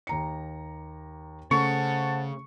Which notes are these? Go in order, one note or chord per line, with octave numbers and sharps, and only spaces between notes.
D#2 A#5 C#7
C#3 A3 C5 F#5 A5 C#6